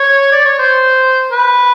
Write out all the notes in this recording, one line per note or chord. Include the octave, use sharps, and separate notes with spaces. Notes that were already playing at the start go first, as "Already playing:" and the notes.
Already playing: C#5
D5
C#5
C5
B4